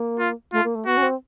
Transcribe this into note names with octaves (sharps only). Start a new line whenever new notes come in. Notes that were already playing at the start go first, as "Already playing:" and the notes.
Already playing: A#3
F4
A3 F4
A#3
A3
B3 F#4
C#4
C4